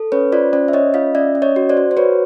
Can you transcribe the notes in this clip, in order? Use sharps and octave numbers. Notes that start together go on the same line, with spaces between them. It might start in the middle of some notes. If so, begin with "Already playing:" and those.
Already playing: A4
C#4 B4 C#5
F4 C5 D5
C#4 C5 D5
E5
C#4 C#5 D#5
F4 D#5 F5
C#4 D5 E5
C#4
C#5 D#5
F#4
C5 D5
F#4
C5
F#4 B4 C#5